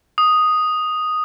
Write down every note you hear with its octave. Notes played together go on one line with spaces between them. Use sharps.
D#6